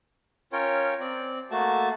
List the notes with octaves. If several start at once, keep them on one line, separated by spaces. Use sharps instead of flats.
C#4 F4 A#4 C#5 G5
C4 D5
A3 A#3 F#4 A5